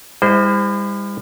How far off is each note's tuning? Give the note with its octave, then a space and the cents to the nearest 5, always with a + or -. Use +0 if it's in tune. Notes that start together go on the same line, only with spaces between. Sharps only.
G3 +45 E4 -25 C5 -25